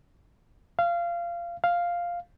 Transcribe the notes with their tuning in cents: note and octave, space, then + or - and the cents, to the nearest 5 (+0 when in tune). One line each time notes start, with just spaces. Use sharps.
F5 -20
F5 +0